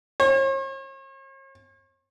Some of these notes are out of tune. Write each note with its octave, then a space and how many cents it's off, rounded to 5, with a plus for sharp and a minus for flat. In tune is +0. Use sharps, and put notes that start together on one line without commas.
C#5 -45